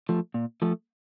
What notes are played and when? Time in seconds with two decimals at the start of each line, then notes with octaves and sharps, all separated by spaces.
0.09 F3 A3
0.34 A#2
0.62 F3 A3